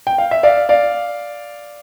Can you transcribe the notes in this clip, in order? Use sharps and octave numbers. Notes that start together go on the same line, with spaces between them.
G5
F5
E5
D5 F5
D5 F5